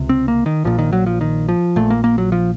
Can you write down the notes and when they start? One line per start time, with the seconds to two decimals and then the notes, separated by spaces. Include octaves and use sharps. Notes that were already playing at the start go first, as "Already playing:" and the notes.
Already playing: C#2 C3
0.09 C4
0.28 A#3
0.46 D#3
0.64 A#1 A#2 F3
0.79 D#3
0.93 F#3
1.06 F3
1.21 D#3
1.49 F3
1.76 A#1 A#2 A3
1.90 A#3
2.04 A#3
2.18 F#3
2.32 F3